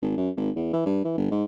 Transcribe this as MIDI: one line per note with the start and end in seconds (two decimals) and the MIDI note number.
0.02 0.17 32
0.17 0.30 42
0.37 0.50 32
0.56 0.73 40
0.73 0.81 52
0.86 1.04 43
1.05 1.16 52
1.17 1.28 31
1.31 1.44 44